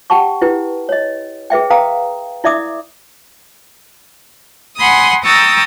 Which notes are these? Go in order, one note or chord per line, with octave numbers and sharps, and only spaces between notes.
G4 F#5 G5 A5 C#6
E4 G4 B4
C#5 D#5
G#4 B4 E5 G5
B4 F5 G5 A#5 D#6
E4 D5 E5 D6 D#6
F#5 G#5 B5 C6 D#6
G5 A#5 C#6 D#6 E6 A6